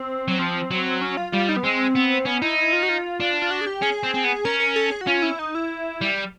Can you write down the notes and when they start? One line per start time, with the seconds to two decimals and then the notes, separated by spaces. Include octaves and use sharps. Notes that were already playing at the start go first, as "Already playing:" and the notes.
Already playing: C4
0.28 F#3
0.39 F3 C4
0.71 F#3
1.01 C#4
1.17 F4
1.32 G3 F4
1.49 D#4
1.56 B3
1.63 G#3 C4
1.95 B3
2.26 B3 C#4
2.42 D#4 E4
2.58 E4
2.73 F4
2.83 F#4
2.89 F4
3.20 D4
3.42 F4
3.51 F#4
3.61 G#4
3.67 G4
3.82 C#4 G#4
4.03 C4
4.14 C4
4.24 B3
4.45 C#4 A#4
4.60 A#4
4.76 A4
4.91 G#4
5.01 F#4
5.07 C#4 F4
5.22 E4
5.39 D#4
5.55 E4
6.01 G3